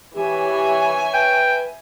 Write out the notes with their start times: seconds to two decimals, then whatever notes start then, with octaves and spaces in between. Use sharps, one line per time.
0.16 E3 G4 C#5 E5 G#5
1.14 B4 G5